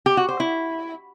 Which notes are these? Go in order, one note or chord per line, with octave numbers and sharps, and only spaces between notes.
G4
F#4
C5
E4